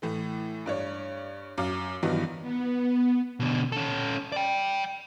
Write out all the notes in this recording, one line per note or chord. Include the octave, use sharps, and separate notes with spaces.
A2 E3 A3
G2 D4 C#5
F#2 F5 D6
G2 D#3 E3 F#3 B3 D#4
B3
B2 D3
C#4 A4
D5 G5